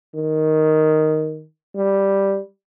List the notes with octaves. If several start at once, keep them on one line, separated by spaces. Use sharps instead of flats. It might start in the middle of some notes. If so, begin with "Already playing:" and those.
D#3
G3